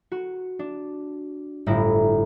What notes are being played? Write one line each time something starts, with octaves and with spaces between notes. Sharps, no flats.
F#4
D4
G1 A2 E4 A#6